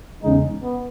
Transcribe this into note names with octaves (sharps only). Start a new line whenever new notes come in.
E2 C#3 G#3 D#4
B3